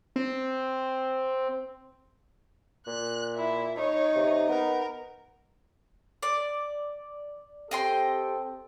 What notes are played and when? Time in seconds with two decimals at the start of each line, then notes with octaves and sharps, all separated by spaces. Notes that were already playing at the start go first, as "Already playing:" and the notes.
0.16 C4
2.87 A#2 F#6
3.36 E4
3.78 D#4 C#5
4.15 C3
4.49 B3 A#4
6.23 D5
7.71 C4 G4 A4 D#5 G5 C6